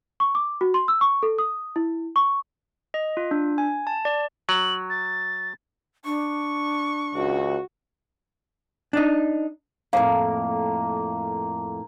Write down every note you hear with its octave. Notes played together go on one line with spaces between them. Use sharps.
C#6
D6
F#4
C6
E6
C#6
A4
D#6
E4
C#6
D#5
F4
D4
G#5
A5
D5
F#3 F#7
A6
D4 C#6
C#2 F#4
D4 D#4
F2 A2 A#3 F5